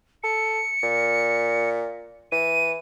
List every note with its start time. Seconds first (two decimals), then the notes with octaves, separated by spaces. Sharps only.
0.23 A4 C#7
0.83 A#2
2.32 E3 D#7